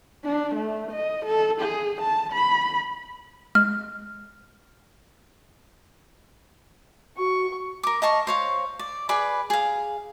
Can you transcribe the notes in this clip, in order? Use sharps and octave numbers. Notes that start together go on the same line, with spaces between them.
D4
A3
D#5
A4
G#4
A5
B5
G#3 F6
F#4 C#6
A#4 D6
D#5 F5 A5 C#6
C5 C#5 F5
D5
G#4 B4 D5 B5
G#4 F5